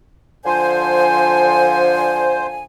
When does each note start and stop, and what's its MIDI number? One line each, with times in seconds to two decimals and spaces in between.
0.45 2.64 50
0.45 2.64 53
0.45 2.47 72
0.45 2.64 80